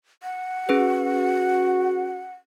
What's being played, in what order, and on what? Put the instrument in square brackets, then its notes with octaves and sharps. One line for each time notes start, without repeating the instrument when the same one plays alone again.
[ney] F#5
[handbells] C#4 G#4 B4 [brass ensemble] F#4